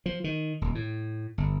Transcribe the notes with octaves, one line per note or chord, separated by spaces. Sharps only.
F3
D#3
D#1
A2
G1